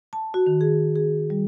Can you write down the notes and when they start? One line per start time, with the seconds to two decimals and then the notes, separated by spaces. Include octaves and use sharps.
0.13 A5
0.34 F#4
0.47 D#3
0.61 G#4
0.96 G#4
1.30 G3